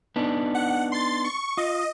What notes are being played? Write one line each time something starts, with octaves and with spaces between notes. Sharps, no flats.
B3 D4 D#4
F#5
C6 A6
C#6
F4 D#5